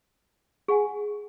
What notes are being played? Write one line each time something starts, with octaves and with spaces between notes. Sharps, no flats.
G#4 F#5 G#5